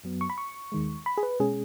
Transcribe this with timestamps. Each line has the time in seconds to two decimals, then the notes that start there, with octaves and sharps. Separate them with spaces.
0.04 F#2 F#3 B3
0.21 C#6
0.30 B5
0.38 C#6
0.72 D#2 D#3 G#3
1.06 B5
1.17 G#4
1.23 B4
1.40 B2 G#3 C#4 G#4